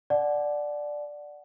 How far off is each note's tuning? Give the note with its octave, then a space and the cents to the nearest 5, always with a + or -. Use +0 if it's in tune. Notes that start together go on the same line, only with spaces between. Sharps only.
D5 +5 F#5 +0 A5 -40